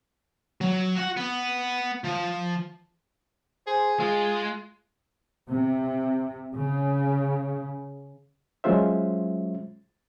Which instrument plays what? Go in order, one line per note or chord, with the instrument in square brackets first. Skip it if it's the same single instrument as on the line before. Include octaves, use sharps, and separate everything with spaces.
[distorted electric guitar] F#3
F#4 F#5
B3
F3
[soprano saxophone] G#4 [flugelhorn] C5
[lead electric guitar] G#3 [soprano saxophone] F4 [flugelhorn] G#4
[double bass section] C3
C#3
[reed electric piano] F#3 G#3 C#4 F4 C5 E5